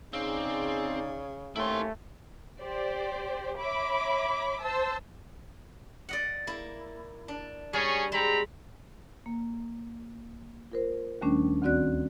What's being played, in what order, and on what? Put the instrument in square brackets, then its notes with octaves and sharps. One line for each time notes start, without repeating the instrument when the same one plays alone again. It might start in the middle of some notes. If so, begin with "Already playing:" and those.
[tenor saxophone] C#3 [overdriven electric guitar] C4 [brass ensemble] D#4 G#4 D5
[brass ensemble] D#2 C3 C#4 [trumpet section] A3 [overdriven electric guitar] E4 C6
[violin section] G4 C5 D5
C#5 E5 B5 D6
C5 A5 E6
[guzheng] D5 D#5 F#5
A#3 E4
D4
[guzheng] G3 [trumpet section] C#4 G#4 C#5
[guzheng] G#3 [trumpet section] C4 A#5 B5
[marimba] A#3
F4 A#4 C5
D#2 D#3 G3 A3 C#4 D4
D2 D#3 C4 F#4 D5 F#6